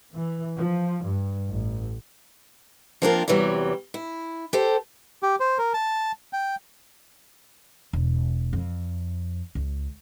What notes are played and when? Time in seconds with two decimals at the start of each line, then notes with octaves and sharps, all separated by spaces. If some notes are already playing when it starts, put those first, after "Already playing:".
0.15 E3
0.57 F3
1.03 G2
1.50 A1
3.02 F3 A#3 C4 D4 F4 A#4
3.28 E2 C3 E3 F#3 G3
3.94 E4
4.53 G4 A4 C5
5.23 G4
5.40 C5
5.58 A#4
5.74 A5
6.33 G5
7.93 E1
8.53 F2
9.55 C#2